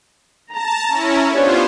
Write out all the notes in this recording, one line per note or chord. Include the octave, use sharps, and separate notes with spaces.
A5 A#5
C#4 E4
B3 D4 F4 G4 C5 C#5